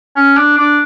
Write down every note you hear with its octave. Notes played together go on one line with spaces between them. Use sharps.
C#4
D4
D4